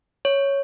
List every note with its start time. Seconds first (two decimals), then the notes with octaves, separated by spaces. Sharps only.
0.25 C#5